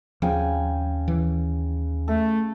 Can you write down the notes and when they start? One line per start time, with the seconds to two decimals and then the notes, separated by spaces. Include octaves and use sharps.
0.22 D#2 C#3 F3 G5 G#5
1.08 E3
2.08 A3 A4